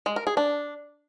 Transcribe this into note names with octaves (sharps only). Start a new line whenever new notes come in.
G#3
A#4
G#4
D4